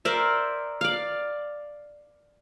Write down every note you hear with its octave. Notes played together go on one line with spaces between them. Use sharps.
A#4 C5 D5 E5
D5 F5